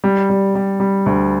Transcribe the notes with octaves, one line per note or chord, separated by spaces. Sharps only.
G3
G3
G3
G3
D2